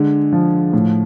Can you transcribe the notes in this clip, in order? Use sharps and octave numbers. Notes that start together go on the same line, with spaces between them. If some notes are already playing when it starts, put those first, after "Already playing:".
Already playing: D3 G#3
F3
A2